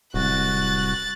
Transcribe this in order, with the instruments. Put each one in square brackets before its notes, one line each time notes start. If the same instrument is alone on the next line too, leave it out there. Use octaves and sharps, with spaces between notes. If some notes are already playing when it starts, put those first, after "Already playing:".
[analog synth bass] D1 [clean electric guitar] C2 [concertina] F#4 [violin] F#6 A6